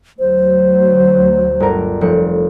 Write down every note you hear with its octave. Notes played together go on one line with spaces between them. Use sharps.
D2 F#3 C5
G1 A#4
F1 C#7